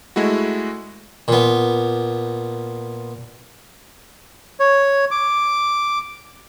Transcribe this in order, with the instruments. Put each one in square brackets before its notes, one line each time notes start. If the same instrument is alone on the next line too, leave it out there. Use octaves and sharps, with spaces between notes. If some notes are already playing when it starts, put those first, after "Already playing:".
[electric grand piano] G#3 A3 E4 F#4
[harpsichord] A#2 B3
[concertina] C#5
D6